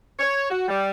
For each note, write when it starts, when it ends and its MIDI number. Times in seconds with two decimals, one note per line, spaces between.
0.19 0.49 73
0.51 0.68 66
0.68 0.91 55